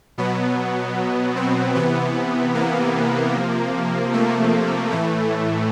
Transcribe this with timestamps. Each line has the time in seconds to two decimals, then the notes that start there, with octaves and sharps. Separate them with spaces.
0.18 B2 F#3 B3
1.36 C4
1.75 C3 E3 B3
2.55 A#3
3.34 C3 F3
4.13 A3
4.92 A2 E3 A3